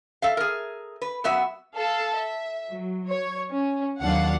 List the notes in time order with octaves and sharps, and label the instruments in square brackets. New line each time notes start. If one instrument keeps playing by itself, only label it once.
[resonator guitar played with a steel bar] A4 E5 F5
G#4 A#4
B4
F#2 B3 F#4 E5
[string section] A4 F5
E5
F#3
C#5
C#4
D#2 F#3 D4 F5 F#5